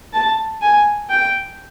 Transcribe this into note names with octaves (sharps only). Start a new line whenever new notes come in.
A5
G#5
G5